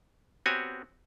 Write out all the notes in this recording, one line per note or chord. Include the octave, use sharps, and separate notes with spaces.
B3 C4 F#4 G4 C#5 G#5